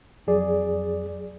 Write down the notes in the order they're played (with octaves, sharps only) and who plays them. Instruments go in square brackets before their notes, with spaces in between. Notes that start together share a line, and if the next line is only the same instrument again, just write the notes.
[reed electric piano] F2 F#3 G#4 D5